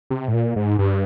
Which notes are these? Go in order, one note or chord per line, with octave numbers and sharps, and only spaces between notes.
C3
A2
A#2
G#2
G2